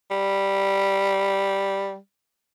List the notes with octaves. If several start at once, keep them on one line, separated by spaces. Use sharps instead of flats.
G3